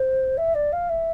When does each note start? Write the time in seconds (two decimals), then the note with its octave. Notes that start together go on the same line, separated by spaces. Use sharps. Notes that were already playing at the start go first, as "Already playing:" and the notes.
Already playing: C5
0.37 E5
0.55 D5
0.72 F5
0.89 E5